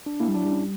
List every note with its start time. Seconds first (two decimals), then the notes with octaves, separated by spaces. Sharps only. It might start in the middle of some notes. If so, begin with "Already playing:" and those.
0.06 D4
0.20 A#3 E4
0.28 G3
0.34 F#3 D4
0.45 G3
0.52 C#4